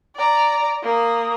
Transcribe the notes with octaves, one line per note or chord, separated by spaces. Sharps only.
D5 A#5
A#3 D#6